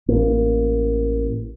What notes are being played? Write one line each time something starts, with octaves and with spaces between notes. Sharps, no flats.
A1 A#3